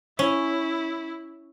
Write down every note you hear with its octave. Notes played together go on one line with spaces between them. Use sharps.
C#4 E4